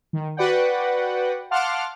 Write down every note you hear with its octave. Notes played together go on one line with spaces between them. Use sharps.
D#3
F#4 B4 D5 F#5 G5
F5 F#5 A5 C6 D6 F6